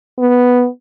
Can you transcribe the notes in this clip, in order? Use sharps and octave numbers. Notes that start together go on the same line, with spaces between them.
B3